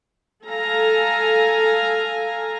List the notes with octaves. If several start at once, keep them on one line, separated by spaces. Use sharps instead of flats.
A4 F5 G#5 A#5